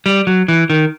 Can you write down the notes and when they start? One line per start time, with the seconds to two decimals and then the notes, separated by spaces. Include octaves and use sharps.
0.06 G3
0.27 F#3
0.48 E3
0.70 D#3